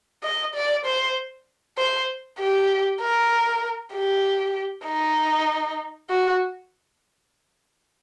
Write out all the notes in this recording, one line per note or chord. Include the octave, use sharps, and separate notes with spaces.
D#5
D5
C5
C5
G4
A#4
G4
D#4
F#4